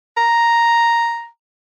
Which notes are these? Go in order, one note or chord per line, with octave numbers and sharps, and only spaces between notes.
A#5